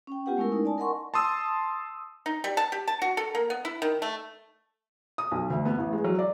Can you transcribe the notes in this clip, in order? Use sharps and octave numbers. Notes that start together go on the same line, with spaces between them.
C#4 G5
B3 F4 G4 B4 F#5
G#3 A3 C#4 E4 A#4
D#4
D5 G#5 A5
A#4 D#5 F#5 C6 C#6
A5 C6 D#6 E6
D#4
G3
A5
G4
A5
F#4
A4
A#3
B3
E4
D#3
A3
D#6
B1
D2
B3
A1
G#3
F#3
D5